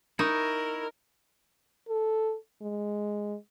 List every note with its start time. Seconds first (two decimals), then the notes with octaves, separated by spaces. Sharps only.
0.19 D#4 E4 A#4 C#6
1.89 A4
2.62 G#3